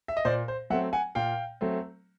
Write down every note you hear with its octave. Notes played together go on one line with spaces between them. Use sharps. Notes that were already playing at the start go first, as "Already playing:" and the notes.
E5
D#5
A#2 C5 D5
C5
F#3 A3 C4 E5 F#5
F#5 G#5
A#2 F5 G5
F#3 A3 C4